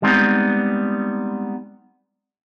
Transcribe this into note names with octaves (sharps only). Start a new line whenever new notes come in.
G3 G#3 B3 C4 D#4